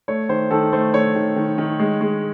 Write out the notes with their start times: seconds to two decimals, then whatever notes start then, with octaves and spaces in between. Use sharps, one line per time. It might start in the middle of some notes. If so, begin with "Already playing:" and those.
0.08 A3 C#5
0.29 D#3 C5
0.51 D#3 A4
0.73 A3 C5
0.94 A3 C#5
1.15 D#3
1.36 D#3
1.58 D#3
1.80 G#3
2.01 G#3